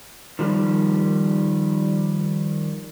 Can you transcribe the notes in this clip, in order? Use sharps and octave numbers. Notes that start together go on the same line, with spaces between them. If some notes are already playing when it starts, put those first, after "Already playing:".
D#3 F3 G3